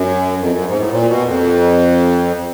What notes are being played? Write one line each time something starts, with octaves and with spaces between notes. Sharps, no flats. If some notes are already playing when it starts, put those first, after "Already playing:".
Already playing: F#2
F2
F#2
G#2
A2
A#2
B2
F2